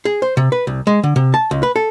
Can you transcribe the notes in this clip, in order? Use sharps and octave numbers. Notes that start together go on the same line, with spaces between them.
G#4
C5
C3
B4
C2
G#3
D3
C3
A5
C#2
B4
A4